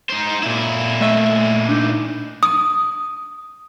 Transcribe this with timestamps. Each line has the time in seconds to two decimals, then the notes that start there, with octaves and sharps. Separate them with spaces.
0.10 D#4 C5
0.43 A#2 E4
1.01 A3 D#5 E5
1.69 D4 D#4
2.43 D#6